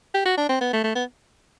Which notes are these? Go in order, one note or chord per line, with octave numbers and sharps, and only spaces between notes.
G4
F#4
D4
C4
B3
A3
A3
B3